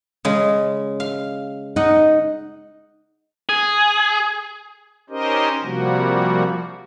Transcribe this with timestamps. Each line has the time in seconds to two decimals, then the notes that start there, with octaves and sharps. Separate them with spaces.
0.25 C#3 G#3
1.00 F5
1.76 D#4 D#5 F#5
3.49 G#4
5.10 C#4 D#4 G4 A#4 C5 D#5
5.62 C3 F3 G3 A#3 F#4